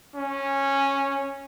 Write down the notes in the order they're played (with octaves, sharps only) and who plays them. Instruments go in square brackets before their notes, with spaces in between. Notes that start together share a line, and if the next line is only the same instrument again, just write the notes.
[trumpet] C#4